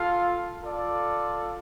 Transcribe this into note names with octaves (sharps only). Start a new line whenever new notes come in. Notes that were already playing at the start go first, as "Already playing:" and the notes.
Already playing: F4 A4 F5
F4 A4 D5